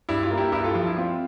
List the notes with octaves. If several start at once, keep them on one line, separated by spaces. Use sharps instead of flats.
G2 E4
F4
A#3
E4 G4
G2 E4 G4
F4 A4
F3 F4
E4
C4 F4